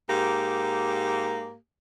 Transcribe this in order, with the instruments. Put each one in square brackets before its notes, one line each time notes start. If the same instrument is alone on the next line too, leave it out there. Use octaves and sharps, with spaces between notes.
[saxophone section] G#2 A#3 G4